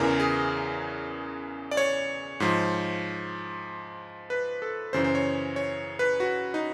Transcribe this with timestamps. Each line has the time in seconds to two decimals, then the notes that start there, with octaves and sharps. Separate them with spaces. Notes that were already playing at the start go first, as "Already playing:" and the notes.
Already playing: E2 C#3 E3 A#4
0.20 G#4
1.71 D5
1.77 C#5
2.40 G#2 F3
4.30 B4
4.62 A4
4.93 F#2 C#3 E3 C5
5.04 C5
5.15 C#5
5.56 C#5
5.99 B4
6.20 F#4
6.54 D#4